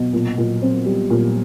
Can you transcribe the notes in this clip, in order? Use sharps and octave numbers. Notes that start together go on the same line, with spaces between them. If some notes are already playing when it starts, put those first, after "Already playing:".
Already playing: B2
A#2
A#2
C4
G3
A#2